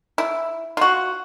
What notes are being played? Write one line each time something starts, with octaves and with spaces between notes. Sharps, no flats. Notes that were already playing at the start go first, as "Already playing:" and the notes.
E4
F4 F#4